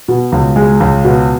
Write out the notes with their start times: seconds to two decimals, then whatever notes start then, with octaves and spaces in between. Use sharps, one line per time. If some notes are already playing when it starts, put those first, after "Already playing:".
0.08 B2
0.32 C#2
0.56 G#3
0.80 C#2
1.04 B2